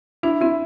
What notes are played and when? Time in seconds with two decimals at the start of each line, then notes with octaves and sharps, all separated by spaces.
0.23 D4 E4
0.41 C4 E4